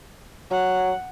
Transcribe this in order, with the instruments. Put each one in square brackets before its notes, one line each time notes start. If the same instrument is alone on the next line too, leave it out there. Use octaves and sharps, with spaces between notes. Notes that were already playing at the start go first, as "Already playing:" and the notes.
[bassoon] F#3 [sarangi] F#5